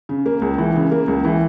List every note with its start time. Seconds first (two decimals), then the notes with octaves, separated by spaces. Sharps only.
0.09 C#3
0.26 A#3
0.42 C#2
0.58 E3
0.76 C#3
0.91 A#3
1.08 C#2
1.25 E3